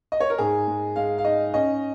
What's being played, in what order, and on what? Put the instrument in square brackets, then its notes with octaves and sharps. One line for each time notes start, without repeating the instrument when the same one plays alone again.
[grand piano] D#5
C#5
A#4
G#2 G#4
G#3
G#3 F5
F5
D#4 D#5
C#4 D#5